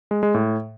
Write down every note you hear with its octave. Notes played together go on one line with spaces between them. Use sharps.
G#3
G#3
A2